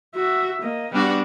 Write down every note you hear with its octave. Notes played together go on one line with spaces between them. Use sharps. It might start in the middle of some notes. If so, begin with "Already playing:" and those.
F#4 E5
A#3 D#5
G3 B3 D4 F#4 F#5